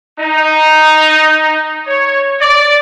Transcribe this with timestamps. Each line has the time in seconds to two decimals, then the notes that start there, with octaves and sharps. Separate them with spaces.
0.20 D#4
1.87 C#5
2.41 D5